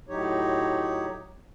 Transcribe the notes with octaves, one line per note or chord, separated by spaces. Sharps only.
A2 F#3 D#4 G4 C#5